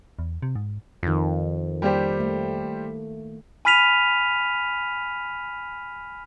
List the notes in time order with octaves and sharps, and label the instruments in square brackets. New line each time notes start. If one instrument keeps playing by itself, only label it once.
[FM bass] E2
C3
G#2
[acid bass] F2 [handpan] D#3 F4
[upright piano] G3 G4 C5 [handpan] A#3
[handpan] A3
[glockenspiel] G#5 B5 F6 B6 D#7 F7